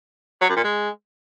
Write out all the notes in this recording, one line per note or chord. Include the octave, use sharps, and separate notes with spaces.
F#3
F#2
A#2
G#3